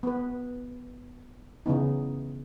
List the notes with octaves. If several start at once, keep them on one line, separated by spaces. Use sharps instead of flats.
B3 B4
C#3 E3 B3 D#4